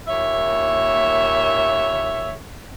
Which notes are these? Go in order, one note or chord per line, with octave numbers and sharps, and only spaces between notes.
D#2 A#2 C#5 E5